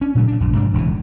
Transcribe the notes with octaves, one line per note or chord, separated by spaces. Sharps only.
C#4 D4
A#2 C#3 F#3 A3
A#2 D4
A#1 F#2 A#2
G#2 C3 D4
E1 C#2 C3 E3